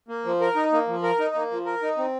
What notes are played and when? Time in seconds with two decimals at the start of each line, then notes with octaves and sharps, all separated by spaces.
0.08 A#3
0.25 F3
0.41 A#4
0.55 D#4
0.72 A#3
0.87 F3
1.03 A#4
1.19 D#4
1.35 A#3
1.51 F3
1.66 A#4
1.82 D#4
1.98 C4